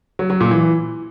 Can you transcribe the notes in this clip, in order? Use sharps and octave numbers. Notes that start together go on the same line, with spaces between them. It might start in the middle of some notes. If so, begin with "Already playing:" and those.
F#3
F#3
A#2
E3